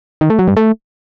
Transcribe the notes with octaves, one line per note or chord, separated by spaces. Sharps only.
D#3
A3
F#3
G2
A3